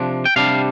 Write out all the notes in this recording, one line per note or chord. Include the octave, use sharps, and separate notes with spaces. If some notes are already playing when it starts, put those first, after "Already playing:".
Already playing: C3 F3 D4
G5
C3 G3 D4 F5